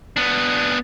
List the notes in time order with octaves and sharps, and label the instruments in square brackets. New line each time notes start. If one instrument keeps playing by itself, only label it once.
[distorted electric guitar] B3 D4